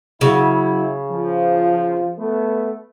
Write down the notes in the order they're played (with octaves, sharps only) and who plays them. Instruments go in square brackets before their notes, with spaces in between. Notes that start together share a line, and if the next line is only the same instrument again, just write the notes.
[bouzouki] C#3 [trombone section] F#3 E4
[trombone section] F3
A3 B3